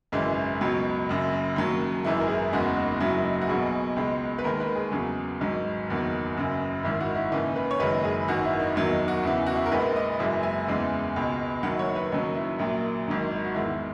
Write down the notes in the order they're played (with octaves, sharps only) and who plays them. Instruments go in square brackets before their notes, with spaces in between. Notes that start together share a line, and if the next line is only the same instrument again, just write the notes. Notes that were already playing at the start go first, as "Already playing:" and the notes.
[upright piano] G#1 F#2 C#3 E3 G#3
C#2 B2 F#3
F#1 F#2 C#3
D#2 C#3 F#3
G#1 F#2 E3 G#3 E4
A#4
G#4
F#1 E2 C#3 G#3 F#4
D#4
F#1 F#2 C#3 F#3 E4
D#4
F#4
B1 B2 F#3 G#4
C#2 B2 G#3
B4
D#2 D#3 G#3 A#4
B4
G#4
E2 C#3 F#3 G#4
G#1 G#2 F#3
F#1 E2 D#3 F#3
F#1 F#2 C#3
G#1 G#2 D#3 E4
F#4
E4
D#2 C#3 E3 D#4
B4
C#5
F#1 F#2 D#3 G#3 B4
G#4
G#1 F#2 D#3 F#4
E4
D#4
E2 D#3 F#3 E4
D#4
F#4
E2 C#3 E3 E4
F#4
E4
A#4
A#1 A#2 G#3 B4
D#5
F#1 F#2 E3 G#3 E5
G#5
E2 C#3 E3 G#3
C#2 B2 G#3
F#1 F#2 D#3 F#3 F#5
C#5
B4
D#2 C#3 F#3 D#4
E4
A#1 A#2 F#3
G#1 G#2 D#3 F#3
F#4
E2 D#3 G#3 E4